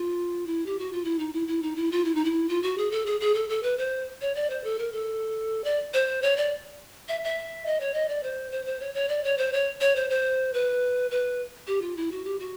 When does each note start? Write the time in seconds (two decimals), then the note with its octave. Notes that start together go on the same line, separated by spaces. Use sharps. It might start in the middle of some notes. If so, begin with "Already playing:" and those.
Already playing: F4
0.47 E4
0.66 G4
0.79 F#4
0.93 F4
1.04 E4
1.19 D#4
1.33 E4
1.48 E4
1.62 D#4
1.76 E4
1.92 F4
2.05 E4
2.15 D#4
2.24 E4
2.49 F4
2.63 F#4
2.78 G#4
2.91 A4
3.06 G#4
3.20 G#4
3.34 A4
3.49 A4
3.63 B4
3.78 C5
4.21 C#5
4.35 D5
4.50 C5
4.64 A4
4.79 A#4
4.92 A4
5.64 D5
5.94 C5
6.22 C#5
6.37 D5
7.09 E5
7.24 E5
7.66 D#5
7.80 C#5
7.94 D#5
8.09 D5
8.23 C5
8.52 C5
8.66 C5
8.80 C#5
8.94 C#5
9.09 D5
9.24 C#5
9.38 C5
9.53 C#5
9.81 C#5
9.96 C5
10.10 C5
10.53 B4
11.11 B4
11.67 G4
11.82 F4
11.97 E4
12.11 F#4
12.25 G4
12.39 F#4